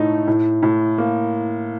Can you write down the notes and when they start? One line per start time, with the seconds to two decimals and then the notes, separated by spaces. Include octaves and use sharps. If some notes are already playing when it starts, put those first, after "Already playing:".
Already playing: A2 A3 D#4
0.28 A2
0.63 A2
0.98 A#3